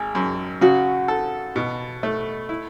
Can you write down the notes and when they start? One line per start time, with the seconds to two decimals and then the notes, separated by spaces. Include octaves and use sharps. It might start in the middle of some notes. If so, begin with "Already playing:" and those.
Already playing: G#1 G#4
0.15 F#2
0.61 C#3 F#4
1.08 A4
1.56 B2
2.03 A3
2.49 E4